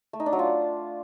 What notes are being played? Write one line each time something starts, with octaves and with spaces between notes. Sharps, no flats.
A3
D#4
D4
F#3
F4